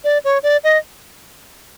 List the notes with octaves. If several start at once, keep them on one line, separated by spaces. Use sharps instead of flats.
D5
C#5
D5
D#5